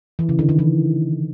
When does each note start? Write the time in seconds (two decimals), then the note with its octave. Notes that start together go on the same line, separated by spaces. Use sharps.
0.19 E3
0.29 C#3
0.39 D3
0.49 D#3
0.59 E3